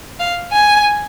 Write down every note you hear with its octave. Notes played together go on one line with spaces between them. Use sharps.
F5
G#5